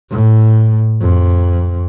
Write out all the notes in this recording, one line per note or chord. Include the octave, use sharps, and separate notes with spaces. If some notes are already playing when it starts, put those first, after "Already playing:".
A2
F2